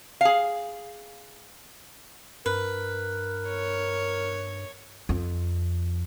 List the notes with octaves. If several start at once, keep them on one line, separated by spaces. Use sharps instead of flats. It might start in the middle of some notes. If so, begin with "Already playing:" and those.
G#4 F5
G2 A#4 B4
C#5
F2